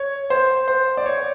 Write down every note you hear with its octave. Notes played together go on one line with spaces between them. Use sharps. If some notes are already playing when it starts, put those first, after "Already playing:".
Already playing: C#5
C5
C5
D5
C#5